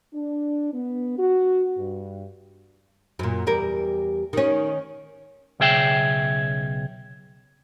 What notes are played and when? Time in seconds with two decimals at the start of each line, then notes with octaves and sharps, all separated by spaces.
0.14 D4
0.73 B3
1.18 F#4
1.78 G2
3.19 F#2 A#2
3.46 E2 G3 A#4
4.33 D#3 C#4
5.60 B1 C#3 G#4 E5 G5